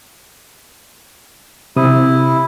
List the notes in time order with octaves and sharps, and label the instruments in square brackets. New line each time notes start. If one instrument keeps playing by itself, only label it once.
[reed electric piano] C3 D#6 [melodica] E4